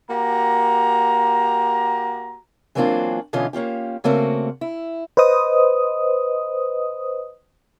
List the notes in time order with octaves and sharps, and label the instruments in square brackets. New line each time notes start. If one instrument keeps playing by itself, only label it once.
[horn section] A#3 F#4 G4 A#5
[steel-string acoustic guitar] E3 F#3 A#3 C4 D4 F4
B2 D3 E3 C#4 F4 D#5
A#3 C#4 F4 G4
C#3 A3 A#3 C4 F#4
E4
[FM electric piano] B4 C5 D#5 D#6